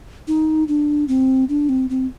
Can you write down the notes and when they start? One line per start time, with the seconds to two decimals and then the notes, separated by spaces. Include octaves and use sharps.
0.27 D#4
0.68 D4
1.08 C4
1.49 D4
1.69 C4
1.90 C4